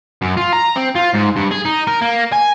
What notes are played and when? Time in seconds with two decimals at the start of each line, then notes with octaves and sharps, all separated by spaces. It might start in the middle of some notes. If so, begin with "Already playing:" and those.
0.22 F#2
0.37 F4
0.53 A#5
0.77 C4
0.96 F4
1.15 G#2
1.37 G2
1.52 G#4
1.65 D#4
1.87 A#4
2.01 A#3
2.32 G#5